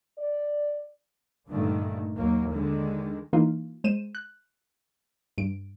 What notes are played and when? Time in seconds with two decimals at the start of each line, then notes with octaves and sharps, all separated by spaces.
0.19 D5
1.49 G2 A#2 D3 D#3 A3
2.16 D#2 F#3 A#3
2.52 D3 D#3 G#3
3.33 E3 A#3 D#4 F4
3.84 G#3 C5 D#7 E7
4.15 F#6
5.38 G2 D7